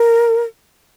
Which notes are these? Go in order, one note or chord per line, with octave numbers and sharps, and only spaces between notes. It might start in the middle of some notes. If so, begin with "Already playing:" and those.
Already playing: A#4